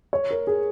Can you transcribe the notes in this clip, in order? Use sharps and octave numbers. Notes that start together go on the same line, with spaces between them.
C#5
A#4
G#4